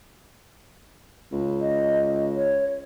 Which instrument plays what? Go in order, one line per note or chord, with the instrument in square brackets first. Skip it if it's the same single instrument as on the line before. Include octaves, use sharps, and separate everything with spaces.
[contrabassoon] C#2
[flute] D#5
C#5